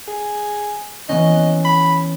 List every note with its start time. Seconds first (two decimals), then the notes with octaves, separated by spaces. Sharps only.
0.08 G#4
1.09 E3 B3 C#4 D#5
1.65 B5